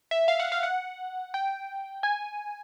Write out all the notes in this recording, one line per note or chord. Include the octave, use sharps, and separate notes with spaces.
E5
F5
F#5
F5
F#5
G5
G#5